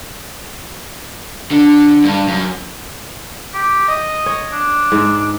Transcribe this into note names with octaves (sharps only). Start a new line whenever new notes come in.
D3
G2
F#2
G4
D#5
C#5
D4
G#2